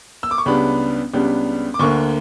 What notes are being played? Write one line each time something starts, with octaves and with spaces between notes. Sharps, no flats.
E6
D6
C#6
C#2 C#3 G3 B3 D4 B5
C#2 C#3 G3 B3 D4
D6
D2 D3 A#3 C#6